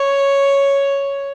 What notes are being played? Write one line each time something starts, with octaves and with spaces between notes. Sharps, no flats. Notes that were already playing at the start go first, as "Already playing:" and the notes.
Already playing: C#5